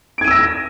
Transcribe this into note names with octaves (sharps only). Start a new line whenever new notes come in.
E6 G#6 A#6 D7 D#7